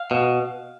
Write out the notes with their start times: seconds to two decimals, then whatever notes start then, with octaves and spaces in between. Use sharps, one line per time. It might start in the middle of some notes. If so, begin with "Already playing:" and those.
Already playing: F5
0.11 B2